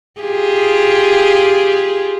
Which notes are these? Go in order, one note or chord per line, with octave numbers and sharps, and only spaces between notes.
F4 G4 G#4